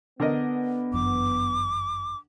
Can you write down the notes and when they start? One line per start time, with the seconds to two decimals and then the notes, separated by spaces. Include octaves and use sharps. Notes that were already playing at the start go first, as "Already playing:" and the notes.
0.20 D3 B3 A#4 D#5
0.93 G1 F#2 E3 D6